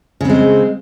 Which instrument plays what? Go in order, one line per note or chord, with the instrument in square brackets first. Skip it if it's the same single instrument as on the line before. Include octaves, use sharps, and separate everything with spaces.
[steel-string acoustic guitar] C#3
C4
G#3